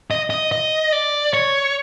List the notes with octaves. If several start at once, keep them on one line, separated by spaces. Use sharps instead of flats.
D#5
D#5
D#5
D5
C#5